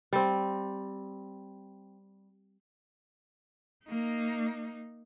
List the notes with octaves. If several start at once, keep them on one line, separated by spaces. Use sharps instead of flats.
G3 C4
A#3 D#4